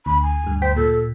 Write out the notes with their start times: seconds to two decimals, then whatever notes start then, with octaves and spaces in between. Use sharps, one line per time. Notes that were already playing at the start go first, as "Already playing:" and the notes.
0.06 D2 B5
0.23 G#5
0.44 D2 G2
0.62 D2 C5 G5 B6
0.77 A#2 A4